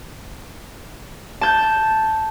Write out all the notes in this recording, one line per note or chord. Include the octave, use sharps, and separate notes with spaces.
A5 G6